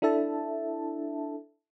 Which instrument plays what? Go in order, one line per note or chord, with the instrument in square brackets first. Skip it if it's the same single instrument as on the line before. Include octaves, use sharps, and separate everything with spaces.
[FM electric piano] D4 E4 A4 E5 A5